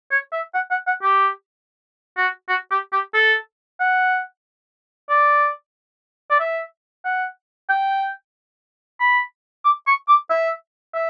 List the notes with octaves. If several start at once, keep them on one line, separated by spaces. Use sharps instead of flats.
C#5
E5
F#5
F#5
F#5
G4
F#4
F#4
G4
G4
A4
F#5
D5
D5
E5
F#5
G5
B5
D6
C#6
D6
E5
E5